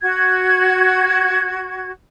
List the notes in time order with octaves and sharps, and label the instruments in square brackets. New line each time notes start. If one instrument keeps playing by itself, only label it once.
[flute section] F#4 G#6